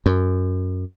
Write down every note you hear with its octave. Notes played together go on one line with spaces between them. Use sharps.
F#2